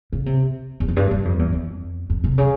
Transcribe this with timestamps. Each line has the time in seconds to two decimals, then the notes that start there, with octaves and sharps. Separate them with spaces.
0.13 C#3
0.26 C3
0.80 E2
0.88 F2
0.97 G2
1.11 G2
1.25 F2
1.39 E2
1.53 F2
2.10 F2
2.24 C3
2.38 C#3